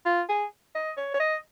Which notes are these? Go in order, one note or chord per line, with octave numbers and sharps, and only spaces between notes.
F4
G#4
D#5
C#5
C#5
D#5